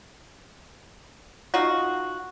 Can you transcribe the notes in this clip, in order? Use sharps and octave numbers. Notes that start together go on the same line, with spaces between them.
D#4 F4 F#4